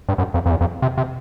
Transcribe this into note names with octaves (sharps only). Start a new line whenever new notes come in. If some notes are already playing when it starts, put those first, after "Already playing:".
G2
F#2
F2
F2
E2
F2
C3
C3